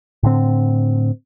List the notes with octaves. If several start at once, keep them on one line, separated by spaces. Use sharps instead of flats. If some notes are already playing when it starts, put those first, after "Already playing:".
A2 D3 C4